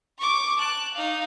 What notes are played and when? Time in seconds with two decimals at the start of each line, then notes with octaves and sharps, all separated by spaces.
0.18 C#6 D6
0.58 A5 F#6
0.94 D#4 F5